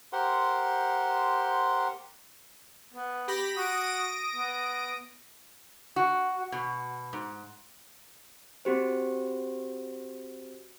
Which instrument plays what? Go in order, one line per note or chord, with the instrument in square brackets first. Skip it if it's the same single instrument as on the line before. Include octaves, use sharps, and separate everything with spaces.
[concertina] G4 A#4 C5 F#5 C6
[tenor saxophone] B3
[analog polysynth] G4 B5 A#6
[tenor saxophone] F#4 [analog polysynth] D#6 A#6 D7
[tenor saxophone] B3
[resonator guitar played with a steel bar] F#4
B2
G#2
[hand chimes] C4 F#4 G4 C5